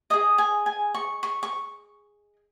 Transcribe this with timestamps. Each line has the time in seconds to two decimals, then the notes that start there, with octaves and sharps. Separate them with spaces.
0.10 G#4 D#5 D#6
0.38 G#5
0.66 G#5
0.94 C#6
1.23 C#6
1.43 C#6